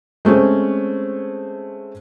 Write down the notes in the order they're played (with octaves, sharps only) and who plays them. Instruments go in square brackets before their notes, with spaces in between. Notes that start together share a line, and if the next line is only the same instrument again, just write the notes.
[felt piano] G#3 A3 C4 C#4